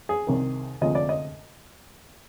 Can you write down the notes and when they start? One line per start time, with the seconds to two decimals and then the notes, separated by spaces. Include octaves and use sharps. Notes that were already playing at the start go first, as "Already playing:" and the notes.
0.09 G#4
0.27 C2 C3 D#3
0.81 D2 C3 F3 G#3 D#5
0.95 D5
1.09 D#5